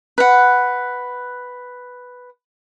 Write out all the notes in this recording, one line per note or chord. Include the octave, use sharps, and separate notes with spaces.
B4 F#5